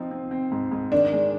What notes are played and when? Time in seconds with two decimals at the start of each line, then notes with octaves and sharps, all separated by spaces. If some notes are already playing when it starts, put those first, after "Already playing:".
Already playing: F3 C4 D#4
0.11 C4
0.31 C4
0.52 G#2
0.72 G#2
0.92 D#3 D4
1.12 G#3